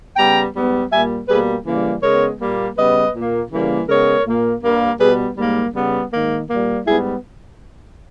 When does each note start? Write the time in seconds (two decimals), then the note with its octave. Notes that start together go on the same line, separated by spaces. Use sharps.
0.16 C#3 G3 B3 G5 A#5
0.54 G#2 G3 B3
0.91 A#2 G3 A#3 E5 G#5
1.27 B2 G3 A#3 G#4 B4
1.65 C#3 E3 G3 A#3
2.02 C#3 G#3 B3 A#4 C#5
2.39 A#2 G3 A#3
2.76 C#3 G3 B3 B4 D#5
3.14 A#2 A#3
3.51 C#3 E3 G3 A#3
3.88 C#3 G#3 B3 A#4 C#5
4.25 A#2 A#3
4.62 G2 G3 A#3
4.99 B2 G3 B3 G#4 B4
5.36 G#2 G3 A#3
5.74 C#3 G3 B3
6.10 G#2 D#3 A#3
6.48 A#2 G3 A#3
6.85 G#2 G3 B3 E4 G#4